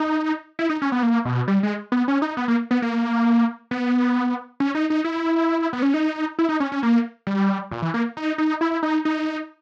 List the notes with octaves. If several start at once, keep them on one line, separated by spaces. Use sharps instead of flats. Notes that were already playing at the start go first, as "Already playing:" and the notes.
Already playing: D#4
E4
D#4
C#4
B3
A#3
B2
G3
G#3
B3
C#4
D#4
B3
A#3
B3
A#3
B3
C#4
D#4
D#4
E4
B3
C#4
D#4
E4
D#4
C#4
C#4
A#3
G3
A#2
E3
A#3
D#4
D#4
E4
D#4
D#4